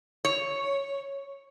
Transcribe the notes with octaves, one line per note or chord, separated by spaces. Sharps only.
C#5